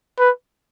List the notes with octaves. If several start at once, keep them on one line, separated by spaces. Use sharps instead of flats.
B4